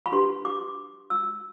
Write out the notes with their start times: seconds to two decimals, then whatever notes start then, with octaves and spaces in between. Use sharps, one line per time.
0.06 B5
0.12 D4 G4 B4 C6
0.45 D6
1.10 E6